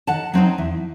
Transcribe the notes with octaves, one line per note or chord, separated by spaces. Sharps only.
D#3 F#5 A5
F#3 C4 D#4
E2